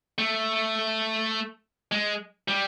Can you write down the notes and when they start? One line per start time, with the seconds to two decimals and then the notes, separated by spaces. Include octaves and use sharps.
0.18 A3
1.92 G#3
2.48 G3